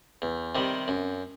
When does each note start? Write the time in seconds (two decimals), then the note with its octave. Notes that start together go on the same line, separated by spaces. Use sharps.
0.22 E2
0.55 C3 D#3 G3
0.88 F#2